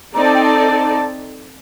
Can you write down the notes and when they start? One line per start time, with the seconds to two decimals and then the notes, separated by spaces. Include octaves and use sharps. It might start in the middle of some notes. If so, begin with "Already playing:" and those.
0.14 C4 D#4 A4 D5 A#5
0.25 A5
0.34 G5
0.44 A5